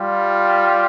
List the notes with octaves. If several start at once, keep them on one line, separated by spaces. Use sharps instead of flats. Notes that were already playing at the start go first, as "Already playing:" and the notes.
Already playing: G3 F4